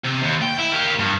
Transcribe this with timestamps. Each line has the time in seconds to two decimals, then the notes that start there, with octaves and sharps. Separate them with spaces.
0.04 C3
0.23 D#2
0.42 G5
0.58 E4
0.72 A#3 G4
0.99 G2